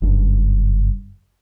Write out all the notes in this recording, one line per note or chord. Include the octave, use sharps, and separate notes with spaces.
F#1 G2